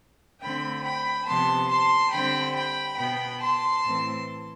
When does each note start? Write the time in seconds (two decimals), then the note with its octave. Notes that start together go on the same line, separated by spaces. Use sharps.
0.41 D3 A3 C4 G5 B5
0.85 G5 B5
1.27 C3 F3 B3 A5 C6
1.70 A5 C6
2.13 D3 G3 C4 G5 B5
2.55 G5 B5
2.98 B2 B3 G5 B5
3.41 A5 C6
3.84 A2 E3 A3 C4